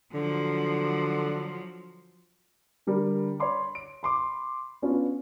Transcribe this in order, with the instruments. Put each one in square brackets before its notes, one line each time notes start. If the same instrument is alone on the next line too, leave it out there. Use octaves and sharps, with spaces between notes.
[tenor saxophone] D3 [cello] F3 F#3
[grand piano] D3 G3 A#4
C#5 D5 B5 C6 D6
D7
B5 C6 D6
B3 C#4 D4 F4